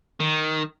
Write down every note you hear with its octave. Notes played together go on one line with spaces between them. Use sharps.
D#3